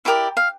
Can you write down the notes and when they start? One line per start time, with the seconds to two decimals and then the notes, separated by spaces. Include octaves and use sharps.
0.05 E4 G4 A#4 D5 D6
0.37 F5